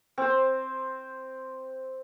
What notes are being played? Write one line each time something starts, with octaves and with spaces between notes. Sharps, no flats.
C4 C5